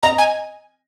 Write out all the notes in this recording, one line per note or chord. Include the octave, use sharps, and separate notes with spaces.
D#5 A#5
G#5